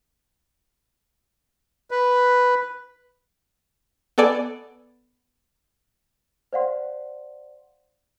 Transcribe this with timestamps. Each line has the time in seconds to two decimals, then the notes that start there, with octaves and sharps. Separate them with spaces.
1.91 B4
4.18 B3 A4 D5 G#5
6.53 C5 D5 F5 F#5 C6